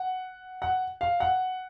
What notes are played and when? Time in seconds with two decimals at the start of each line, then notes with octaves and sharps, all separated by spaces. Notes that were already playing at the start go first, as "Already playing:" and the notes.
Already playing: F#5
0.62 F#5
1.01 F5
1.20 F#5